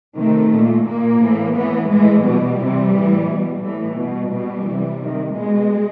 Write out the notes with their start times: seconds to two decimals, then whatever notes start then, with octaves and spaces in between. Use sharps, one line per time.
0.16 C3 D#3 A3
0.50 A#2
0.85 A#2 A#3
1.20 A2 E3
1.55 A2 E3 B3
1.88 A2 E3 G#3
2.23 B2 G3
2.57 C3 E3
2.92 A2 E3
3.27 B2
3.61 A2 E3
3.96 B2 G3
4.30 B2
4.65 C3 E3
4.99 C3 D#3
5.33 B2 G#3